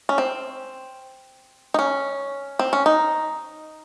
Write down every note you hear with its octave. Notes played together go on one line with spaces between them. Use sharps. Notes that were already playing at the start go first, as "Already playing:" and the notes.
C#4
C4
D#4
C#4
C4
C#4
D#4